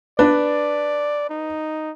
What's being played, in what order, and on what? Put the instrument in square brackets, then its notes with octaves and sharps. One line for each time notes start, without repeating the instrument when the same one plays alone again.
[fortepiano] D4 [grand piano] B4 [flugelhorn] D5
[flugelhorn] D#4